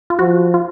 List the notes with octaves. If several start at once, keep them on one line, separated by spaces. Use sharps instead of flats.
F4
F3 F#4
F4